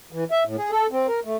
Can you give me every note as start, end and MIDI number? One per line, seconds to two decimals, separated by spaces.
0.12 0.24 52
0.31 0.44 76
0.46 0.56 45
0.58 0.71 68
0.71 0.87 69
0.92 1.07 60
1.08 1.20 70
1.25 1.37 57